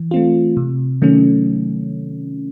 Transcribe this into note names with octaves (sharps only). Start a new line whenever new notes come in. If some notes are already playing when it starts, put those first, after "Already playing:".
Already playing: E3
A3 C4 F4
C3
D#3 F#3 A3 C#4